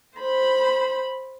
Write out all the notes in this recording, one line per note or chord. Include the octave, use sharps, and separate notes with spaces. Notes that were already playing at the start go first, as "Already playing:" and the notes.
C5 B5